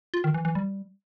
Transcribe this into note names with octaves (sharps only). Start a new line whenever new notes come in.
F4
D#3
E3
E3
G3